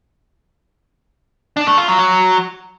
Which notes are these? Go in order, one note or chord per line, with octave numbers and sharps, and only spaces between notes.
D4
A3
F4
F#3
F#3